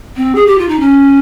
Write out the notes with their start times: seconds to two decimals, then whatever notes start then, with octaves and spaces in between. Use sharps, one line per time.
0.16 C4
0.35 G#4
0.47 G4
0.58 F4
0.68 D#4
0.80 C#4